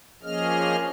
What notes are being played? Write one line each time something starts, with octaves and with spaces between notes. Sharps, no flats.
F3 A#3 C#4 G#4 D#5 F6